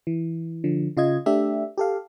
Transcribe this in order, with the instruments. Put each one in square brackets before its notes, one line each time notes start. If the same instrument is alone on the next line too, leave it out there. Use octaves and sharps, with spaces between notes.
[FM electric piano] E3
D3 F3
C#3 F4 D#5 G#6
A3 D4 G4 E5
G4 A4 F5